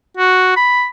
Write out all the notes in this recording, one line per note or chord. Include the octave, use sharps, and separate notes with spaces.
F#4
B5